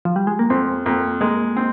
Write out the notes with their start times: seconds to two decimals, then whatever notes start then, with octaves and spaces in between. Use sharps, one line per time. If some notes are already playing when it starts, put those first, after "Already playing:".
0.05 F3
0.16 G3
0.27 G#3
0.39 A#3
0.50 F2 C4
0.86 F2 A#3
1.21 G#3 A#3
1.57 C4